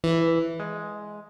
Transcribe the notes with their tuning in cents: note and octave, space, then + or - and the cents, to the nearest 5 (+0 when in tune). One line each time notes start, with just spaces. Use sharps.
E3 +5
G#3 +5